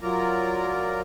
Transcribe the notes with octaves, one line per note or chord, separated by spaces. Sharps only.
F#3 F4 A#4 D5 A#5